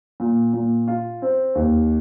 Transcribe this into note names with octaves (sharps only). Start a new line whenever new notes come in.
A#2
A#2
F4
C4
D#2